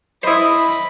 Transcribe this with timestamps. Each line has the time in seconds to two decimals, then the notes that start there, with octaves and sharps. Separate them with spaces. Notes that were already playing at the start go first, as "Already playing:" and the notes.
0.23 E4 C5 D#5 B5 D#6